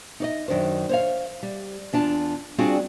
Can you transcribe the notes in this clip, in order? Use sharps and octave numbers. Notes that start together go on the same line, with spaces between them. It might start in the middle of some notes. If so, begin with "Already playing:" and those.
D#4 D5 D#5
F#2 D#3 D4 C5
C5 C#5 F5
G3
E2 D4 F4 A5
G3 C4 D4 F4 F#4 G#4